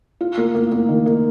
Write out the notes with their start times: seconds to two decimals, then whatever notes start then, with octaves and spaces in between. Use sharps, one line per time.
0.21 F4
0.37 A#3
0.55 A#3
0.72 A#3
0.89 D#3
1.06 A#3